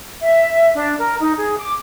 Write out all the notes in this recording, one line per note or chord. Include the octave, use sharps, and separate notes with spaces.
E5
D4
A#4
D#4
G#4
D6